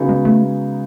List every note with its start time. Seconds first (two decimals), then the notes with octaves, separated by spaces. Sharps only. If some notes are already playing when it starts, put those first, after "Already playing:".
Already playing: C#3 F#3 B3 D#4 G#4
0.09 G#3
0.25 A3
0.41 G#3